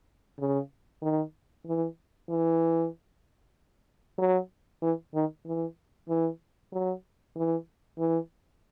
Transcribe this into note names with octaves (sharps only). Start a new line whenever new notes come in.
C#3
D#3
E3
E3
F#3
E3
D#3
E3
E3
F#3
E3
E3